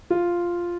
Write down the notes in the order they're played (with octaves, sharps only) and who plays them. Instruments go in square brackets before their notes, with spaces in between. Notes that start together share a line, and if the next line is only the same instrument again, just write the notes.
[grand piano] F4